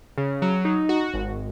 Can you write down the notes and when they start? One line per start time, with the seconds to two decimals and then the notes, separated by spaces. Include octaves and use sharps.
0.18 C#3
0.42 F#3
0.65 D#4
0.89 F#4
1.14 G#1